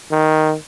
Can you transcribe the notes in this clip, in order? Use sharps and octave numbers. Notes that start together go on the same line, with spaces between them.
D#3